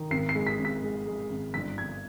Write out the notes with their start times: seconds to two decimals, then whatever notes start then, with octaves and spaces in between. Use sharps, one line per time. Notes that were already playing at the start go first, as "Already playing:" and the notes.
Already playing: D#3
0.11 G#1 C7
0.29 C7
0.35 G#3
0.47 B6
0.59 G#1
0.65 B6
0.83 G#3
1.06 G#3
1.30 G#1
1.54 G1 B6
1.78 G1 G#6